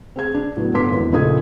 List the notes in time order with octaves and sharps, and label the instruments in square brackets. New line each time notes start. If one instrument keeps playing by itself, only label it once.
[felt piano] C4 G#4 G#6
D4
A2 F#3 B3
G1 D3 B3 C6 D6 B6
G#1 E2
A#1 C#3 D#4 A4 D#6 G#6